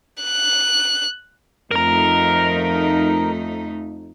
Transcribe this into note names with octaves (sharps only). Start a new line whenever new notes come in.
F#6
F2 A3 D#4 A#4 A#5